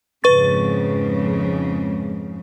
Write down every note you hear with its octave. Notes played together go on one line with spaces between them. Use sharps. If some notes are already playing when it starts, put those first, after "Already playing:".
F2 G#2 C#3 B4 C#6 A6